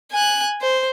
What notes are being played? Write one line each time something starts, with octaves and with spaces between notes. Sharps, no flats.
G#5 F#6
C5